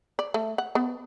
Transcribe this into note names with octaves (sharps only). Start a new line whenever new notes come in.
D5
A3
F#5
B3